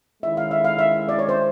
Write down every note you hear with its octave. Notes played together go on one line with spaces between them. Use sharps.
D#3 G#3 C#4 E4 E5
F5
E5
F5
E5
D5
C#5
C5